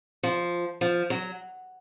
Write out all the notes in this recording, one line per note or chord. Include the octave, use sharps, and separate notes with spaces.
F3
F3
F#3